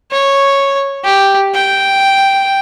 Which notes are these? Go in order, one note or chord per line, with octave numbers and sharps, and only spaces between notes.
C#5
G4
G5